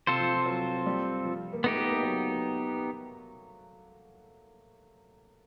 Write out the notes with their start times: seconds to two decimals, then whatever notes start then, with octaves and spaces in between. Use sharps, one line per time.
0.07 C3 C4 F4 A4 C5
0.20 F3
0.34 F3
0.46 F#3
0.86 G3
1.25 F3
1.53 A#3
1.64 A3 B3 D#4 G4
1.77 A3
1.90 A#3
2.03 F#3